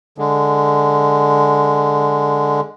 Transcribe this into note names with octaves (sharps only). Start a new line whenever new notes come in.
D3 G#3